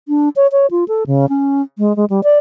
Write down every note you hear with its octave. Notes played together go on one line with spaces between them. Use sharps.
D4
C#5
C#5
F4
A4
C#3
C#4
G#3
G#3
G3
D5